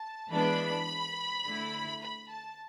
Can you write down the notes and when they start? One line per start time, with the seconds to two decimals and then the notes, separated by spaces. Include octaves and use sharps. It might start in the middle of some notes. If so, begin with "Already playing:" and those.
Already playing: A5
0.31 E3 G#3 B3 D4 B5
1.44 D3 A3 E4
2.02 B5
2.30 A5